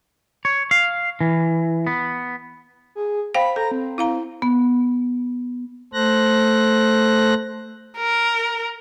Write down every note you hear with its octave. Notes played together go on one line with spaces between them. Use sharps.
C#5
F5
E3
B3
G#4
C5 F5 G5 B5
A4 A#5
C4
E4 F5 A#5
B3
A3 A4 C5 F#6 A#6
A#4